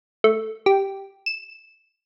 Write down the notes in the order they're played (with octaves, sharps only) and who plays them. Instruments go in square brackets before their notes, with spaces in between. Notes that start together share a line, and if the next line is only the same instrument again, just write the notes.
[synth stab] A3
G4
E7